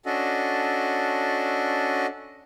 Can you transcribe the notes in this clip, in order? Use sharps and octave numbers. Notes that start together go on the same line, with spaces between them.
C#4 D4 F#4 A4 D#5